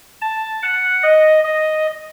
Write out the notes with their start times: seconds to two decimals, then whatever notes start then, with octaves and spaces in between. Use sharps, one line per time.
0.21 A5
0.63 F#5
1.03 D#5
1.44 D#5